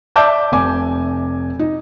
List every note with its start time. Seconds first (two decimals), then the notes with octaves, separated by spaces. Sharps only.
0.16 D5 E5 A5 D6 E6 G6
0.52 F1 C3 G#5 D6
1.59 D#4